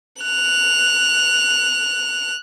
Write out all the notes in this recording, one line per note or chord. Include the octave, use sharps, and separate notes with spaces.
F#6 F7